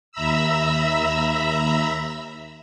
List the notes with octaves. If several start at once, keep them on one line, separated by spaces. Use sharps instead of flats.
D#2 E5 A#5 B5 E6